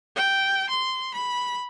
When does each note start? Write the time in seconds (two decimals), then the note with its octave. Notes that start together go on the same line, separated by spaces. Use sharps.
0.16 G5
0.70 C6
1.14 B5